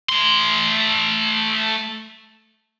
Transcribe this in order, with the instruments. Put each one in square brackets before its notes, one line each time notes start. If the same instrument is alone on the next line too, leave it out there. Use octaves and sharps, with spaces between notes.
[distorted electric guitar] A3 C6